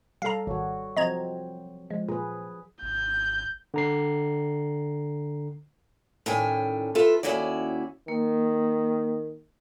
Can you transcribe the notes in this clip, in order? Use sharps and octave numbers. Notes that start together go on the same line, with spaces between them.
G3 A4 F5 A#5
G#1 F#4 C#5
F3 F#3 C4 D#5 A#5 G#6
F3 G#3
A#2 G#4 B4
G#1 G6
D3 A#5 C7
A2 D#3 G3 C#4 G5 G#5
F4 A4 B4 E5
D#2 C3 C#4 E4 F#4 D5
D#3 A#3